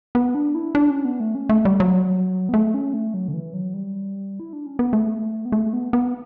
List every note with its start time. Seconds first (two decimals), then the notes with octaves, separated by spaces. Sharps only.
0.15 B3
0.35 D4
0.55 E4
0.75 D4
0.90 C#4
1.05 B3
1.20 A3
1.35 C#4
1.49 A3
1.65 G3
1.80 F#3
2.49 B3
2.54 A3
2.74 C#4
2.94 A3
3.14 F#3
3.28 D3
3.34 E3
3.54 F#3
3.74 G3
4.40 E4
4.53 D4
4.66 C#4
4.79 B3
4.93 A3
5.45 B3
5.52 A3
5.73 B3
5.93 B3